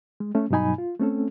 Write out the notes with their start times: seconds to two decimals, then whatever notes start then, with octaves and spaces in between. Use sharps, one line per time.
0.20 G#3
0.35 A3 C#4
0.50 G2 B2 F#3 D#4 G#5 B5
0.78 F4
0.99 A3 C4 C#4 A4